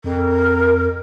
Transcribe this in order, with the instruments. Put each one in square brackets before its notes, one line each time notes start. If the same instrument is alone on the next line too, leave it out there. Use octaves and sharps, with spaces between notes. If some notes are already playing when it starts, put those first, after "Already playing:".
[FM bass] F2 [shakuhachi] A#4